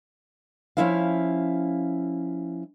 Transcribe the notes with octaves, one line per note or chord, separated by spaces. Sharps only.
F3 B3 C#4 E4 E5 F5